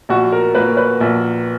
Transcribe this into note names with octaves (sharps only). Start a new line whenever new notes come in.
A#1 F#4
A#4
A#2 A#3 B4
B4
A#1